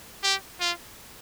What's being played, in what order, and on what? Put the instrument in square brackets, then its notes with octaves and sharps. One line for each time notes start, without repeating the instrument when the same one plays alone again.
[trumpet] G4
F4